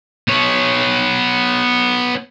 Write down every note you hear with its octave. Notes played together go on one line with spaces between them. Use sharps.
B3 C#5